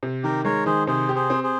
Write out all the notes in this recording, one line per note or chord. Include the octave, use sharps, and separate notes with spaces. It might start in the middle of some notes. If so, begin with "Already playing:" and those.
C3
D#3 G4 A#4
G#3 A#4 C#5
D#3 G#4 C5
C3 G#4 C5
G4
G#4 C5
C4
G#4 C5